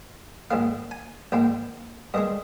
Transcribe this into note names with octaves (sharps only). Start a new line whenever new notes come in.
A#1 G#2 D#3 A#3 F5
G#5
A#1 G#2 D#3 A#3 G5
G2 D#3 G#3 D#5